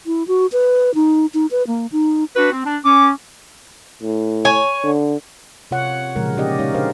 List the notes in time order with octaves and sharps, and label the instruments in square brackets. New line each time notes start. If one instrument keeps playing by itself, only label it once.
[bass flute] E4
F#4
B4
D#4
D#4
B4
A#3
D#4
[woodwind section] D4 F#4 B4
C4
D4
[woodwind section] C#4 [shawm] D6
[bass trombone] A2
[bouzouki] C#5 G#5
[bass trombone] D3
[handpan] C3 F4 C#5 F#5
A#2 C#3 E3 F3 G#3 A#4
C#4 D#4 G4 D5 D#5
G#3 D#4 C#5 F5
D4 A#4 C5 F5